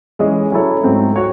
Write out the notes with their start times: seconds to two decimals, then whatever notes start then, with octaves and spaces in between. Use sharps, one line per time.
0.19 E3 G#3 C#4 G#4 D#5
0.52 F#3 C#4 E4 A4 C#5
0.83 G#2 F#3 A3 C4
1.16 F#4 C#5